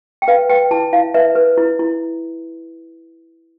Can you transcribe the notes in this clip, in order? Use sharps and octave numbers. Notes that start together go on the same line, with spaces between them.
G5
B4 F5
B4 G5
E4 A5
E4 F5
B4 E5
B4
E4
E4